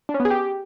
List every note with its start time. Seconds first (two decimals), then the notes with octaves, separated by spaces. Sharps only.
0.09 D4
0.14 C#4
0.20 B3
0.25 G#4
0.30 G4